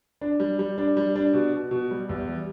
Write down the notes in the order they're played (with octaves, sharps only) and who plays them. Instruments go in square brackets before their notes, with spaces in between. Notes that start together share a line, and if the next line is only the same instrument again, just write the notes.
[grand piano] D4
G3
G3
D4
G3
D4
B2
B2
B2
G3
E2
G3